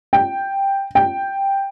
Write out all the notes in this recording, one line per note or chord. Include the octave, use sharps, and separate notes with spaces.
G5
G5